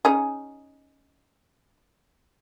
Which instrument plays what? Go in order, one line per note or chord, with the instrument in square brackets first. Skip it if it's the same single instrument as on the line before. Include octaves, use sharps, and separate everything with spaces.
[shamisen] C#4 D#4 G#4